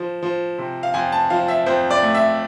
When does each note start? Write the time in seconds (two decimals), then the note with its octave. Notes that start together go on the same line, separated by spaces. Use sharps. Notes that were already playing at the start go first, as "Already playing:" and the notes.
Already playing: F3
0.22 F3
0.58 C3
0.83 F5
0.94 F2 G#5
1.12 A5
1.30 F3 F5
1.48 E5
1.66 F2 C5
1.91 D5
2.02 A3
2.15 E5